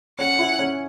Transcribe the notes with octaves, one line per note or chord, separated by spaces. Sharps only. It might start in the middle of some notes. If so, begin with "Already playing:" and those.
C#4 F#5
E4
C#4